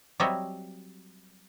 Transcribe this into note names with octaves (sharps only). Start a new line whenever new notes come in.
F#3 G3 C4 C#5 D#5 E5